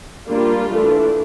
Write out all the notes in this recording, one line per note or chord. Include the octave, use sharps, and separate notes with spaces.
G3 A#3 D4 F4
E3 A3 D4